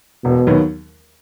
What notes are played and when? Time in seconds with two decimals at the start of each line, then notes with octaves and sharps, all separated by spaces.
0.24 E1 B2
0.47 D#2 D#3 F#3 B3